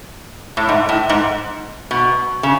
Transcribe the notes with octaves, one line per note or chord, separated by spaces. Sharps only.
A2
G#2
A2
G#2
B2
C#3